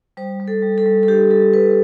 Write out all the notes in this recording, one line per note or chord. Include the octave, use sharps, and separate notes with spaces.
G3 C5
G3
A4
G3
A4
G3
A4
D4 G4
G3 A4
G3 B4